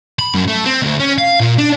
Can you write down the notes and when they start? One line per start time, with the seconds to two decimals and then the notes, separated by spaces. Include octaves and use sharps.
0.19 B5
0.35 F#2
0.48 A3
0.66 C4
0.82 D2
1.00 C#4
1.18 F5
1.40 A#2
1.58 D4